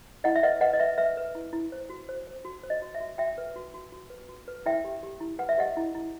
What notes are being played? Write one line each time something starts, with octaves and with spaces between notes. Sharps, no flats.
E4 D#5 F#5
E5
B4 D#5 F#5
B4 D#5 F#5
D#5
B4 E5
B4 E5
B4
E4
E4
C5
F#4
C5
C5
F#4
C5
D#5
F#4
E5
F#4
F#4 E5 G5
B4
F#4
F#4
F#4
B4
F#4
B4
E4 E5 G5
G4
G4
E4
B4 F#5
E5
G4 D#5 F#5
E4
E4